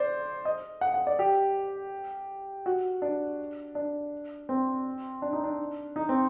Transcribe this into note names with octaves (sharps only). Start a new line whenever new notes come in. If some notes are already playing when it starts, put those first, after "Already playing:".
Already playing: C5 D5
D#5
F#5
F#5
D5
G4
F#4
D4
D4
C4
D4
D#4
D4
D#4
C4